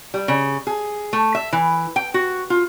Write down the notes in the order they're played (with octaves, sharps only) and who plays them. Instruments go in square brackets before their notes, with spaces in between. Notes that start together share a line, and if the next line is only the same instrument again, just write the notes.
[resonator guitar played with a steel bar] G3
C#3
G#4
A3
E5
E3
G5
F#4
F4